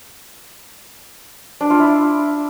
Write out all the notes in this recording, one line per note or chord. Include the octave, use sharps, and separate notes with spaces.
D4
F4
E4